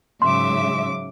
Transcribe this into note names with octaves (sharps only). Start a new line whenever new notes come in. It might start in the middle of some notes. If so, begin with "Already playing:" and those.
G#2 C#3 F#3 E5 C6 D6